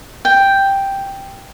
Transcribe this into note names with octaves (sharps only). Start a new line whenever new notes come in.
G5